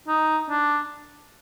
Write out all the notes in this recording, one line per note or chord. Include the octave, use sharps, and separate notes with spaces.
D#4
D4